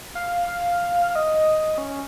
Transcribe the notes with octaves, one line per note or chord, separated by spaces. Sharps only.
F5
D#5
C#4